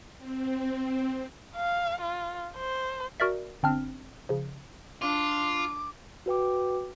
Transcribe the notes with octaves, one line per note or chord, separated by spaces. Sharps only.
C4
F5
F4
C5
F#4 A#4 D5 E5
G1 C4 D4 F6
C#3 F3
D4 F4 D6
F#4 B4 G5 D6